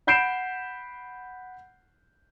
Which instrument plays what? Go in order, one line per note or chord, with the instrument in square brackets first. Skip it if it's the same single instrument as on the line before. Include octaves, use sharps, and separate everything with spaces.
[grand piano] F#5 B5 G6 C7 D7 E7